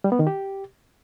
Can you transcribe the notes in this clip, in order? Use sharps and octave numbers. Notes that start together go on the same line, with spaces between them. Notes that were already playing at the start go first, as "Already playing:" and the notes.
G3
B3
D#3
G4